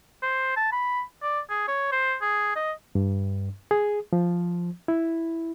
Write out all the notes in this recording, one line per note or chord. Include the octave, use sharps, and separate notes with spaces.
C5
A5
B5
D5
G#4
C#5
C5
G#4
D#5
G2
G#4
F3
E4